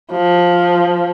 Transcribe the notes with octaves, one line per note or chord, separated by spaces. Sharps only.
F3